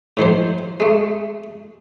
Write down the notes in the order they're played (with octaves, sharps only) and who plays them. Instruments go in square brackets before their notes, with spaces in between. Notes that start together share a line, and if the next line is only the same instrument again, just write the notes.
[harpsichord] A2 D#3 F3 C5
G#3 A3